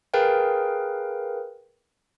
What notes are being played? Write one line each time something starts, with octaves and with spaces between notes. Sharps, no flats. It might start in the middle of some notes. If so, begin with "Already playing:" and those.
G#4 A#4 B4 F5 G5